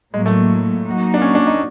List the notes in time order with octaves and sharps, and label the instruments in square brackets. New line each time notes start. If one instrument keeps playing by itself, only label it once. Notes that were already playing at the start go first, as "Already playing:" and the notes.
[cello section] A2 F#3 A#3 [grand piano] G#3
[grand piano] A3
[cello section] F#3 A#3 D#4 F#4
[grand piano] D4
C#4
D4
D#4